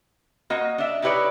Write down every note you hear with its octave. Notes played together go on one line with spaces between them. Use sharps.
A#3 F#4 D#5
D4 E5
D#4 E4 G4 B4 C#5 D5